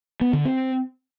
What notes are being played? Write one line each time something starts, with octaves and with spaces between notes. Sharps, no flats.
B3
D3
C4